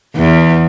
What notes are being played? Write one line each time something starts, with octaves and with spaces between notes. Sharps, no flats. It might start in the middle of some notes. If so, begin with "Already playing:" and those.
E2